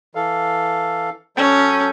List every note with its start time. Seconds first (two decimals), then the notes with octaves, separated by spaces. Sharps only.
0.15 E3 A4 F5
1.37 F#3 C#4 A4 G6